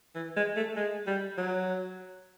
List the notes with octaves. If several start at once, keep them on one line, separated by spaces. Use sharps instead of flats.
E3
G#3
A3
G#3
G3
F#3